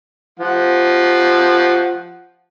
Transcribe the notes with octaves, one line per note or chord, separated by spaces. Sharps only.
F3 F#5